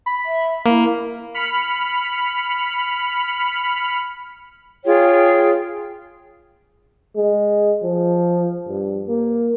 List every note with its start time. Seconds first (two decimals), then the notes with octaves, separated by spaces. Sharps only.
0.06 B5
0.26 E5
0.66 A#3 E4
1.34 B5 F6 C#7
4.85 F4 G#4 C#5 G5
7.16 G#3
7.83 F3
8.68 G2
9.08 A#3